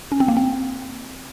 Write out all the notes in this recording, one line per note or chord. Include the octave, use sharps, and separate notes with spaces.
C#4
C4
A#3
C4